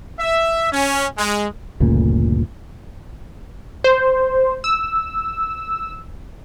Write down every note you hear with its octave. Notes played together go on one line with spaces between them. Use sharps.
E5
C#4
G#3
G1 D2 A#2 C#3
C5
E6